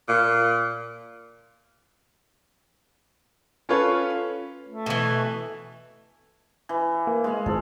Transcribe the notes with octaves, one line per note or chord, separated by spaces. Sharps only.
A#2
C#4 F4 A4 B4 C#5
A3
B2 E3
E3
A#3
G#3 F5
G#1 G#2 F3 A4